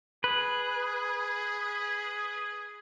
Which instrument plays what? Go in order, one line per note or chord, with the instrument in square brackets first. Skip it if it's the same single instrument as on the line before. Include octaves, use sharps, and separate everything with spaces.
[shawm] G#4 [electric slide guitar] B4